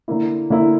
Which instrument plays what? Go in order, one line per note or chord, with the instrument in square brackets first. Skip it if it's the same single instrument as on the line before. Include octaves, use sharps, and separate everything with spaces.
[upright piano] D3 A#3 E4
D3 A#3 E4